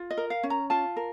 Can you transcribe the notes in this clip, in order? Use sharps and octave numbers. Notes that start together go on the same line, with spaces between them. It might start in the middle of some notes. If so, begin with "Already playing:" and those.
Already playing: F4
D#5
A#4
F5
C#4
A#5
F4 A5
A#4